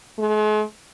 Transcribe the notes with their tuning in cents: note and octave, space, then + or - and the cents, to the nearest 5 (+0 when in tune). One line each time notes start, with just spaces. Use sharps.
G#3 +45